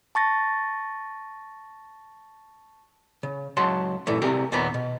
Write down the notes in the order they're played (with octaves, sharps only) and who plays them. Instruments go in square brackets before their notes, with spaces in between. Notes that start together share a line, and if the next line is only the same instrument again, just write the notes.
[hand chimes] A5 C#6 A6 A#6
[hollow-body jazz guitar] C#3
C#2 F#3 A5 C6
G2 A#2 E3 A3
C2 C3 G4 G#4 A#4
D#2 A#2 B3 A#5 B5
B2